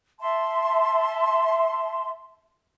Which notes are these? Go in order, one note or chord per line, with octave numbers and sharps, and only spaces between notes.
E5 A5 C6